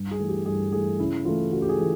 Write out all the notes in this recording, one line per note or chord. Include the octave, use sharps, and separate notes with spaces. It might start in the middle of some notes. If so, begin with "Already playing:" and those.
Already playing: G2
G#4
E3 A3
G4
G2 G#4
E3 A3 G#4
C#3 E4
E3 A3 F4
C#3 F#4
G4
G#4
E3 A3